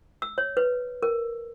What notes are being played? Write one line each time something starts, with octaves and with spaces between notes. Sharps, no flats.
E6
C#5
B4
A#4